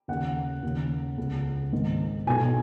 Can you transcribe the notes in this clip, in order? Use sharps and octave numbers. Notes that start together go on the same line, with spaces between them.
D#2 C#3 F#5
D#2 C#3
C#2 C#3
G#1 G#2 D#3
B1 B2 G#5